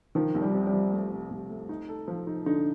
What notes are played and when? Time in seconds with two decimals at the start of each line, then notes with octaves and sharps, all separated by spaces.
0.15 D#3 F3
0.35 C2
0.42 G3
0.54 C3
0.67 G3
0.73 F3
0.92 A3
1.12 C3
1.30 C2
1.50 A3
1.69 D#4
1.89 A4
2.08 F3
2.27 D#4
2.46 D3 D#4